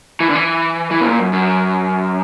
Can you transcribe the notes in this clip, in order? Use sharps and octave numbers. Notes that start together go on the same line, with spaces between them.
E3
D3
E3
E3
B2
A#2
F#2
F#2